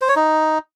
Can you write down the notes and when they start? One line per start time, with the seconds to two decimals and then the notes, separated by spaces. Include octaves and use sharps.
0.01 C5
0.09 C#5
0.16 D#4